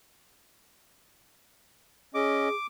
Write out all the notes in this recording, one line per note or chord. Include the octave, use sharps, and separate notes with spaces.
C#4 G#4 D#5 D6